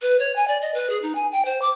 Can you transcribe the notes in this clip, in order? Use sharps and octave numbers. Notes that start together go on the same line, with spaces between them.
B4
C#5
G#5
D5
D#5
B4
G#4
D#4
G#5
G5
C5
D6